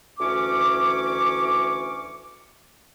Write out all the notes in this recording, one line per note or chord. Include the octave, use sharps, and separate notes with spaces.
D2 E3 C#4 C#6 D6